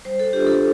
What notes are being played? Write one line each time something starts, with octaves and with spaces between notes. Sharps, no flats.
G3 C5
A4
D4 F4 G4
A4